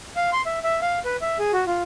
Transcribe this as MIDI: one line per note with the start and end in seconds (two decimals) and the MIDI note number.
0.16 0.30 77
0.32 0.42 84
0.46 0.59 76
0.64 0.80 76
0.82 0.99 77
1.05 1.16 71
1.21 1.38 76
1.39 1.52 68
1.53 1.64 66
1.67 1.83 65